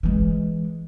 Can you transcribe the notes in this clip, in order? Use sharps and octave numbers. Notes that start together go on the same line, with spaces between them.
E3 G#3